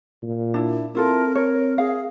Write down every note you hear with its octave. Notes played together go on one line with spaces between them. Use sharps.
A#2
D4 E4
C4 E4 F4 A4 A#4
A#4 C#5
G#4 F5